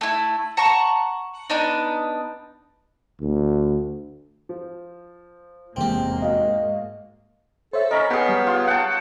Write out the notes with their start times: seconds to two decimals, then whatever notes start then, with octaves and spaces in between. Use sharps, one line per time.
0.01 A3 E4
0.57 F#5 A5 A#5 C#6
1.50 B3 D4 D#4
3.21 D2
4.49 F3
5.76 F1 E2 G#2 C3 G#3 A#3 C4 G4
6.22 F#4 D#5 F5
7.73 A4 C5 C#5 E5
7.91 C#4 A#4 D#5 A#5 B5
8.10 B3 G4 G#4
8.29 G3
8.47 F4
8.67 F#5 G5 A5